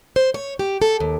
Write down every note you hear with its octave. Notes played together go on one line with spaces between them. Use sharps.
C5
C#5
G4
A4
D#2